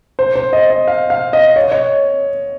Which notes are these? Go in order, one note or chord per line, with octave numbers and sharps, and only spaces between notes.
C5
C5
D#5
D#5
F5
F5
D#5
C#5
D#5
C#5